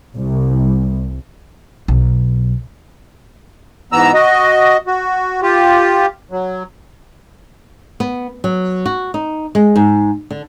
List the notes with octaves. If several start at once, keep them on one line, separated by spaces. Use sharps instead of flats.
C2
B1
G#2 E3 B3 A#5 E6
F#4 D#5
F#4
F4 G4
F#3
B3
F#3
F#4
D#4
G#3
G#2
D3